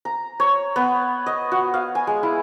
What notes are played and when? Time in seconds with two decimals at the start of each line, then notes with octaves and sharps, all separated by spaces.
0.05 A#5
0.40 C#5
0.76 B3
1.26 D#5
1.52 F#4
1.74 F5
1.95 G#5
2.07 G#3
2.23 E4